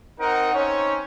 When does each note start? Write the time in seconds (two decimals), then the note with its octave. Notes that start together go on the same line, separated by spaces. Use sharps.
0.20 C4 D#4 A#4 F#5
0.53 C4 C#4 D#4 C#5